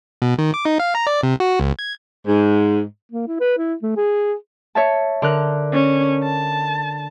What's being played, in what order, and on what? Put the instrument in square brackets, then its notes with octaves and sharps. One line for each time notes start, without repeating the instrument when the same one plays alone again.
[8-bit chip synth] B2
D#3
D6
D#4
F5
A#5
D5
C3
F#4
C#2
G#6
[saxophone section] G#2
[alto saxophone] A#3
E4
B4
E4
A3
G#4
[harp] C#5 E5 A5
D3 A#4 F#6
[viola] C#4
A5